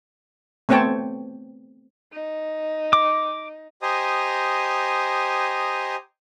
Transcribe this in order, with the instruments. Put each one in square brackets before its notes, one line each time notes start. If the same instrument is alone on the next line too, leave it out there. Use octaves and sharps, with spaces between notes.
[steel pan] A3 B3 C4 C#5 G5 A5
[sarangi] D#4
[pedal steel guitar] D6
[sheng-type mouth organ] G4 C5 D#5 G#5 A#5 D#6